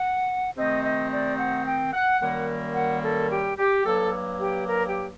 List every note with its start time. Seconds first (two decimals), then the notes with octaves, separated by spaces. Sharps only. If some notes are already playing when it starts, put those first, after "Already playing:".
Already playing: F#5
0.56 C3 D#3 A3 C4 D#4 D#5
0.84 D#5
1.12 D5
1.39 F#5
1.66 G5
1.93 F#5
2.21 F#2 D#3 G3 A#3 F#5
2.75 F#5
3.03 A4
3.31 G4
3.58 G4
3.85 G2 F#3 A#3 A4
4.40 G4
4.68 A#4
4.88 G4